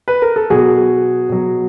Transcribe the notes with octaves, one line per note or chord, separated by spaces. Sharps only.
B4
A#4
A4
B2 F#3 F#4 G#4
B2 F#3